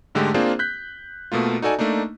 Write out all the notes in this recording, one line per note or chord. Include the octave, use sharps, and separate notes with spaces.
G#2 D3 G#3 A3 G4
A#3 C4 D4 F4 G#4 C5
F#6 G6 B6
B2 A3 A#3 F4
D#4 F#4 A4 D5 G#5
A3 A#3 D4 D#4